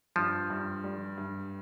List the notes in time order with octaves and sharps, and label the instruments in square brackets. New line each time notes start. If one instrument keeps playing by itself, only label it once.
[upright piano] G2 [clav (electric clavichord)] F3
[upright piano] G2
G3
G2